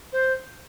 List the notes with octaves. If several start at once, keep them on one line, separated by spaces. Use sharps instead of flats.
C5